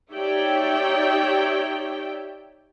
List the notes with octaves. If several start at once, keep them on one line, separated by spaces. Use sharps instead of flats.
D#4 G4 C#5 D5 E5 G5